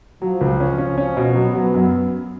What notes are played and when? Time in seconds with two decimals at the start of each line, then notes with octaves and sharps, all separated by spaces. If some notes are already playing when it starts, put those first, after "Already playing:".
0.22 F3 F#3
0.41 C#2
0.60 C#4
0.78 C#4
0.97 F3 C#4
1.17 B2
1.35 F#3 B3
1.55 F#3
1.74 F#2